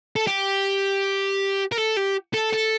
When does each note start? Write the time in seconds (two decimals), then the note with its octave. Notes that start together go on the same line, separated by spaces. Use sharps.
0.16 A4
0.27 G4
1.72 A#4
1.78 A4
1.97 G4
2.34 A4
2.53 A4